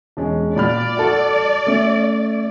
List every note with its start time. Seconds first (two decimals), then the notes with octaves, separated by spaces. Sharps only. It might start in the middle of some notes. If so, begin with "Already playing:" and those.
0.17 E1 G#3 C#4
0.56 A#2 D5 B5 F6
0.97 F#4 A4
1.67 A3 C#4